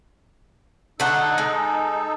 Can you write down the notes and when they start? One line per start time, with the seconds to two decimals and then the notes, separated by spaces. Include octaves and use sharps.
1.00 D3 A3 D#4 A4 F#5
1.38 G#3